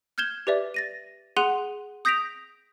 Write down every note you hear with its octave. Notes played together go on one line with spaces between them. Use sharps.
F6 G6 G#6 E7 G7
G4 B4 D5 E5
A6 A#6 D#7
G#4 F#5 C6 F#6 D#7 F7
D#6 G6 A#6 B6 D7 F7